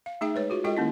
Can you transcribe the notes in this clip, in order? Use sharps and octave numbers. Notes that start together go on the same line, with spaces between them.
F5
A3 D#4 G#4 E5 G5
G#3 B4 C#5
F4 F#4 G#4
G#3 F4 G4 A4 D#5 G5
D#3 A#3 C#4 E4